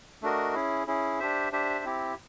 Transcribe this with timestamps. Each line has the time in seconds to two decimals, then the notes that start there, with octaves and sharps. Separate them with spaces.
0.22 A3 D4 F#4 A#4 D#5
0.54 C#4 E4 G#4
0.87 C#4 E4 G#4
1.20 D4 G4 C5 E5
1.52 D4 G4 C5 E5
1.85 C4 E4 G4